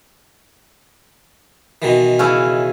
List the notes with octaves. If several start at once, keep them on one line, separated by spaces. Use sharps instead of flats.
B2 D#3 E3
C#3 C#4 E4